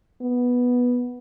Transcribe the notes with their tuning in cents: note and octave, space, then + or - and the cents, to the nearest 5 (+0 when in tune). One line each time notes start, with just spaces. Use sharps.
B3 -5